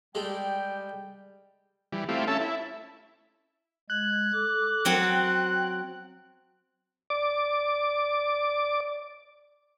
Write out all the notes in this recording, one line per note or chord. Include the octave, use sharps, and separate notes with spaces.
G3 G#3 G4 A4 G5
E3 G3
A3 C4 E4 F4 G4
C#4 A4 E5 A5
E4
G#3 F#6 G#6
A4 D6
F#3 C4 F#5 G5
D5 D6